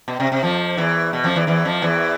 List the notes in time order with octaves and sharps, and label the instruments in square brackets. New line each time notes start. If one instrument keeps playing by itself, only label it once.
[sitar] B2
C3
C3
F2 F3
E2 E3
B2
F2 F3
E2 E3
E2 E3
F2 F3
E2 E3